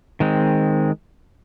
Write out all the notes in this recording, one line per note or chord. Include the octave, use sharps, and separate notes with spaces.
D#3 G#3 C4